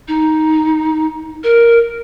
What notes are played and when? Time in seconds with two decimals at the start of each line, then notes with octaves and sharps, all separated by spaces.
0.08 D#4
1.44 A#4